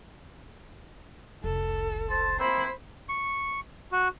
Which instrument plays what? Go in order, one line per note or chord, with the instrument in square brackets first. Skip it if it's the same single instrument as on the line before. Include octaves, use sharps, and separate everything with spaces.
[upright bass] F1 C2 [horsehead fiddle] A4
[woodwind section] C5 A5
[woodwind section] A#3 C4 E4 [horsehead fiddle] C5 B5
[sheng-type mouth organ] C#6
F#4